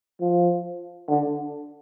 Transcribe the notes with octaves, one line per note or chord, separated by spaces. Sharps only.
F3
D3